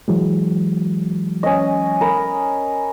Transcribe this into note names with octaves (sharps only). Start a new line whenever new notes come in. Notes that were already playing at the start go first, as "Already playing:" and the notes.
E3 F#3 G#3
C#4 D#5
A#4 B5